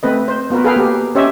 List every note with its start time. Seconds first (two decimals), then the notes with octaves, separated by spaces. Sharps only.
0.03 A3 C4 B4 D#5
0.28 C5
0.50 B3 F4 F#4 A#4 B4
0.64 G#4 A4 B4 F5 G5
0.76 A#3 G4
1.15 C#4 G4 C5 C#5 D#5 E5